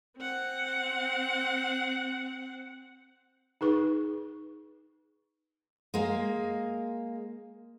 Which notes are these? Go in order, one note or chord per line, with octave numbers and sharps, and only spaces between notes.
C4 F#5
D#4 G#4 B4 C#6
G#3 A#3